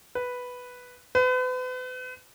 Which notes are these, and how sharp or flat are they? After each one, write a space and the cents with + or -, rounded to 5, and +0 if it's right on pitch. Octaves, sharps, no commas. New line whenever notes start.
B4 +0
B4 +40